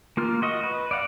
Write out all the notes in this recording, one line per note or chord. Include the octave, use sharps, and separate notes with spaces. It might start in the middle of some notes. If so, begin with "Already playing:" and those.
A#3 F4 F6
F#4 D#5
B4
D5 F5 F#5